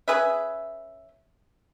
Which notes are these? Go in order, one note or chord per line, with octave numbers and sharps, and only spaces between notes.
C#4 G#4 B4 E5